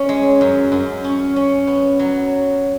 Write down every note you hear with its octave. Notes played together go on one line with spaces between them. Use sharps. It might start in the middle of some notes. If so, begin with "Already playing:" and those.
Already playing: C#4
G#3
F#2
F#2
C#4
C#4
B3
F#3